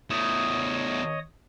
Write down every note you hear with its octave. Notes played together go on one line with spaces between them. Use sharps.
E2 A3 C#5 D#5 D#6